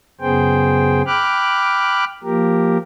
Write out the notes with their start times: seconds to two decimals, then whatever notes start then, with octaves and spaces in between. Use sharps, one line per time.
0.21 F#2 C#3 B3 G#4 C5 G5
1.07 G5 B5 D6 F6 F#6
2.23 F3 A#3 G4 A#4